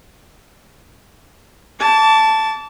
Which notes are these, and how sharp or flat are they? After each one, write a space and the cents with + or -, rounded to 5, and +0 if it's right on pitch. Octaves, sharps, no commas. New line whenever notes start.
A5 +0 D6 -35